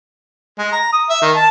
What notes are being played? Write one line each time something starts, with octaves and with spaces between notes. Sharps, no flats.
G#3
A#5
D#6
E5
D#3
A5